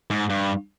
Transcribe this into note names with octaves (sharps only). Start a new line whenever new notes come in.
G#2
G2